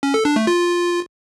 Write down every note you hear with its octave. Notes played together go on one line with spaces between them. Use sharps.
C#4
A4
D4
A3
F4